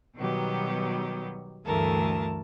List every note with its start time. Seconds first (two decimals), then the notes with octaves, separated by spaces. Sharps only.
0.17 B2 D#3 F#3 G3 B3 G4
1.65 D2 G2 E3 A3 A#4 A5